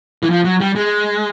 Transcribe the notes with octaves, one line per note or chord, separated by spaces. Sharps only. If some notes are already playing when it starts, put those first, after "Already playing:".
E3
F3
F#3
G3
G#3